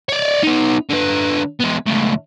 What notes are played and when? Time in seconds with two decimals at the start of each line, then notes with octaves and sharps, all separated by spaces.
0.09 C#5 D5
0.43 B3 D#4
0.90 D3 B4
1.61 G#3 B3
1.87 C#2 A2